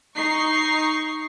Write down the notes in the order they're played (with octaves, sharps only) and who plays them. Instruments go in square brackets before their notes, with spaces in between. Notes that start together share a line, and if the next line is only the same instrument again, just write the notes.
[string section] D#4 C#6 C7